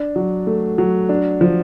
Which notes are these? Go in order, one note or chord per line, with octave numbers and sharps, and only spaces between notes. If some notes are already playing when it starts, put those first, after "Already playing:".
Already playing: D4
F#3
A3
F#3
D4
F3